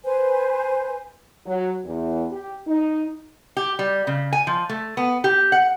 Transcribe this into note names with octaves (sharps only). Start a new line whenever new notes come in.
B4 C5 G#5
F#3
E2
G4
D#4
G4
G3
C#3
G#5
F3
A3
B3
G4
F#5